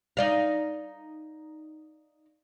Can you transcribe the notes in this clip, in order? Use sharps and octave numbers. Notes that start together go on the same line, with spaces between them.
D#4 D5 F5